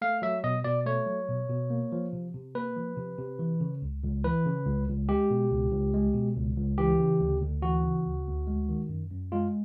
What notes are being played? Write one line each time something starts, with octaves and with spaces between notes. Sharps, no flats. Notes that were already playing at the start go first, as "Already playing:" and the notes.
A3 F5
F#3 E5
B2 D#5
B2 D5
A3 C#5
F#3
B2
B2
A#3
F3
C3
C3
A#3 B4
F3
C3
C3
E3
C#3
C#2
C#2
E3 B4
C#3
C#2
C#2
G#3 G4
B2
C#2
C#2
G#3
B2
C#2
C#2
E3 G4
C#3
D2
D2
E3 F#4
C#3
D2
D2
G#3
D#3
F#2
F#2
G#3 F4